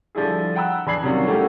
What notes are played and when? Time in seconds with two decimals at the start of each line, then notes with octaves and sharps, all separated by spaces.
0.15 D3 F3 G3 E4 G#4
0.56 F#5 G5 A#5 B5 E6 F#6
0.86 E2 D4 B5 G#6 C7 F#7
1.03 C3 D#3 F#3 G3 C#4 F4
1.27 A3 C#4 E4 F#4 G4 A#4